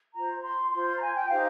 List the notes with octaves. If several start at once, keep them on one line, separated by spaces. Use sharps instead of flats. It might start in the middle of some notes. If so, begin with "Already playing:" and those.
F4 C5 A#5
C6
F4 C5 C6
C6
A#5
G#5
G5
D#4 G4 C5 F5